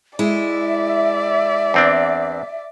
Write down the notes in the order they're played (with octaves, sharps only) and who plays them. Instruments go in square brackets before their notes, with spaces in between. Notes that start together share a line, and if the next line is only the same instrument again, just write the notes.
[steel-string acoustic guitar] G#3 E4 [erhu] D5 [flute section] E5
[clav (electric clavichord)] E2 C4 D4